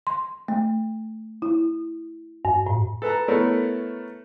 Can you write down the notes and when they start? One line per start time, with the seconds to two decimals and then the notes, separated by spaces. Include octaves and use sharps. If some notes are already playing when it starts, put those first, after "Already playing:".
0.07 C6
0.48 A3
1.42 E4
2.45 G2
2.67 A2
3.02 A4 B4 A5 A#5
3.28 A3 B3 E4 A4 A#4 C#5